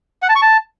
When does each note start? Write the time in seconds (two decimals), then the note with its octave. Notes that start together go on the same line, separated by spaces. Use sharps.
0.22 F#5
0.29 A5
0.35 C#6
0.42 A5